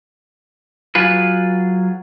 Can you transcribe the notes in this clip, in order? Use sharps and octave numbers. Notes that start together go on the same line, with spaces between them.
F#3 F4 G#4 B4